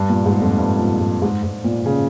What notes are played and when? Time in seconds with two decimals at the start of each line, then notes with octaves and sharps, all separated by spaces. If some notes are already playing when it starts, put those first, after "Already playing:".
Already playing: G2
0.10 A#2
0.26 G#2
0.41 F2
0.58 G2
0.79 A#2
1.00 G#2
1.22 G#2
1.43 G#2
1.64 A#2
1.86 C#3